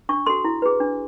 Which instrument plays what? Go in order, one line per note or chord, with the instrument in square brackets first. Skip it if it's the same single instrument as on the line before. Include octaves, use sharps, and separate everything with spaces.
[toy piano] D4 C#6
F#4 A4 C6
E4
G#4 B4
D4